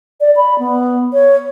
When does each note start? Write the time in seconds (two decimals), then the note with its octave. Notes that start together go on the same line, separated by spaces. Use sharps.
0.21 D5
0.37 B5
0.59 B3
1.13 C#5